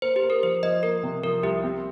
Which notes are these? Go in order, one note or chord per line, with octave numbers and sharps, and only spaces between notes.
A#3 C5
G4
A#3
A#4
F3 C5
F3 D#5
A#3 A#4
C3
F3 A#4
C2 G4
C4